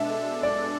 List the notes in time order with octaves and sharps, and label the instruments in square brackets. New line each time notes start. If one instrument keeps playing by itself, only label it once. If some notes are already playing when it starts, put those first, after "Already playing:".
Already playing: [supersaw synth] B2 G#3 D4 A4 [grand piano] E5
[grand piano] D5